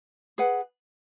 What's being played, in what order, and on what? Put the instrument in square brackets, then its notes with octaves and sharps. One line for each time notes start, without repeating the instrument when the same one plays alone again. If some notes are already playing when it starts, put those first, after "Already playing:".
[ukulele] G#4 B4 F#5